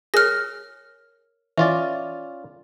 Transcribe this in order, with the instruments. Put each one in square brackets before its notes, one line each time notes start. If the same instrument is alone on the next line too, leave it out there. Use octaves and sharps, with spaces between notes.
[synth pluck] G#4 [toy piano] A#4 C#5 [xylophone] F6 A#6
[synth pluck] E3 [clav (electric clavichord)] C#4 F4 D5 [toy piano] E5